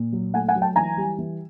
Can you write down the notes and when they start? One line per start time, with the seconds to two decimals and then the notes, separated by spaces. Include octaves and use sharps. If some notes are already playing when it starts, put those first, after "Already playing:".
Already playing: A#2
0.12 F#3
0.34 A3 F#5 G#5
0.48 F#5 G#5
0.56 F#3
0.62 G5 A5
0.76 E3 G#5 A#5
0.97 G3
1.18 E3